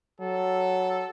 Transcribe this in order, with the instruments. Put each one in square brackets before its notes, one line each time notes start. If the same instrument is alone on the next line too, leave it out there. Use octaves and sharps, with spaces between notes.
[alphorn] F#3 [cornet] A4